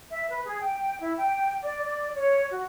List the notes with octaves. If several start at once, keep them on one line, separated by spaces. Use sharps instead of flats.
E5
B4
G#4
G5
E4
G5
D5
D5
C#5
F#4